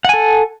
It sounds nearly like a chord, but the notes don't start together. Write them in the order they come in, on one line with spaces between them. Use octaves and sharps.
F#5 G#5 A4